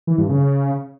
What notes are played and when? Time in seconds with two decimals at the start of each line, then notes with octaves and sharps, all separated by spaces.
0.07 E3
0.18 G2
0.29 C#3